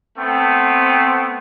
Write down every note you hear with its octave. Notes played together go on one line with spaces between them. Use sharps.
A3 B3 C4